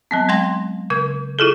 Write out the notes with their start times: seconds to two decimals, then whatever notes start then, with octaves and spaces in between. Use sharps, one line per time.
0.11 F#3 B3 C4
0.29 G#3 G5 C6 A#6
0.90 C#3 A#4 G#6
1.39 E4 F4 G#4 A4